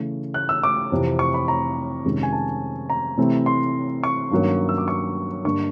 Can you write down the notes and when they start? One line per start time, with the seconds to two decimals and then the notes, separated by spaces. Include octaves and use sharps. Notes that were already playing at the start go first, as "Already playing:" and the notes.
Already playing: C#3 E3 A3
0.34 F#6
0.49 E6
0.63 D6
0.92 F2 C3 E3
1.19 C#6
1.34 B5
1.48 A#5
2.05 F2 C3 D#3 G#3 C#4
2.23 G#5
2.33 A5
2.90 A#5
3.18 C3 E3 A3 C4 E4
3.46 C6
4.04 C#6
4.31 G2 D#3 F#3 A#3 C#4
4.69 E6
4.78 D6
4.88 C#6
5.45 G2 D3 G3 A#3 D4 C#6